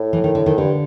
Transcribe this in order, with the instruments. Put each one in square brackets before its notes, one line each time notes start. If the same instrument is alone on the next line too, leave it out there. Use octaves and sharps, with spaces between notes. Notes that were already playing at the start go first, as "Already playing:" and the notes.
Already playing: [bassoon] A2
[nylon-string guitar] E3
D#3
D3
D#3
[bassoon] G2 [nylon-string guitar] D3